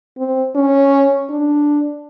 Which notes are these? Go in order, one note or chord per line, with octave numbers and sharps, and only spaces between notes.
C4
C#4
D4